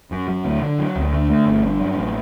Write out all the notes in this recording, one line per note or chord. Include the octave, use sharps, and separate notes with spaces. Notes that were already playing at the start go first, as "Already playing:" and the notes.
F#2
F#3
D2
D3
F#3
D2
D3
A3
G1
G2
F#3
A1